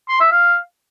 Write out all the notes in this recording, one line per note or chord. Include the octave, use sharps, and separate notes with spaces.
C6
E5
F5